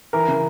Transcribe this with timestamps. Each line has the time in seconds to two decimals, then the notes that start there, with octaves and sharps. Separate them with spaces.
0.13 E3 A#4
0.28 C#3